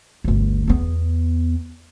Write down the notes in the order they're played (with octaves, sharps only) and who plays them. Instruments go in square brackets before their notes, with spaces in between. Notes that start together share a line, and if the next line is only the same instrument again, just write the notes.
[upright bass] G1 D2
E2 B3